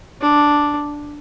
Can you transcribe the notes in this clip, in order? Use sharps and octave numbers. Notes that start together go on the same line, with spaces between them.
D4